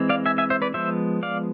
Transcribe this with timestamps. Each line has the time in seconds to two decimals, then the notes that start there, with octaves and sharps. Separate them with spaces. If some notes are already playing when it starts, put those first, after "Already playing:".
Already playing: E3 G#3 C4
0.09 D5 F5
0.26 E5 G#5
0.38 E5 G#5
0.50 C5 E5
0.62 B4 D5
0.74 F3 G#3 B3 C5 E5
1.23 D5 F5